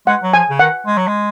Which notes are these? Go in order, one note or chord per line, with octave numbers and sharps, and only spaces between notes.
G#3 F#5
F#3
F3 G#5
C#3
D#3 F#5
G#3
F#3
G#3